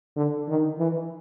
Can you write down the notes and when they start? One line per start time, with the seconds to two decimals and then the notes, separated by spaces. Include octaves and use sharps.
0.16 D3
0.48 D#3
0.79 E3